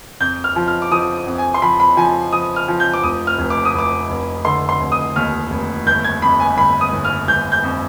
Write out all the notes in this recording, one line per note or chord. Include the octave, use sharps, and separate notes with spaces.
F2 G6
F6
F3
F6
D6
F3 D#6
F2
G#5
C6
F3 B5
B5
F3 G#5
F3 D#6
F6
F3
G6
D6
F1 D#6
F6
F1
D6
D#6
F1 D6
F1
D3 C6
C6
F1
D#6
D#2 F6
F1
G1 G6
G#6
F2 B5
G#5
G1 B5
D#6
G1
F6
G1 G6
G6
F2